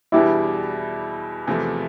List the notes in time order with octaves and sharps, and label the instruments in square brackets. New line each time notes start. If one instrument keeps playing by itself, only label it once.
[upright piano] E2 B2 G3 D4 [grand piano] E4 G4
[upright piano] E2 C3 F3 A3